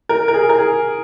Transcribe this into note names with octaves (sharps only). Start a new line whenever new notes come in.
A#4
A#4
G#4
A#4
G#4